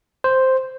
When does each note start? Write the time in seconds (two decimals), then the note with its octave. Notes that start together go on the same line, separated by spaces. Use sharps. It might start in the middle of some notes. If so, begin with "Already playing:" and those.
0.24 C5